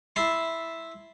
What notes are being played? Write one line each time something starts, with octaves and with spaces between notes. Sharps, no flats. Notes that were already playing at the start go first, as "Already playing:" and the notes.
E4 E5 A5 C6